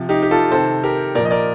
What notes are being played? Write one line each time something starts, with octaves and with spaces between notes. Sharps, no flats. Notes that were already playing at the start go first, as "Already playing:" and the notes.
Already playing: C3 F3
D#4 G4
G4
F4 A4
C3 D#3 A4 C5
G4 A#4
A#2 F3 A#4 D5
D#5
A#4 D5